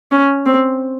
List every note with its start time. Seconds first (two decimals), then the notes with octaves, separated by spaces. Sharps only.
0.12 C#4
0.46 C4